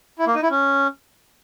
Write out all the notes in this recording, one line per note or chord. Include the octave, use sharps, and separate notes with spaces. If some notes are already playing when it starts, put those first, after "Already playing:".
E4
A#3
D#4
E4
C#4